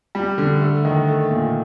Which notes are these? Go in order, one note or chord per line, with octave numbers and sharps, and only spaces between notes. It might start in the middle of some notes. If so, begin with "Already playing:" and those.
G3
D3
A3
D#3
A3
A#2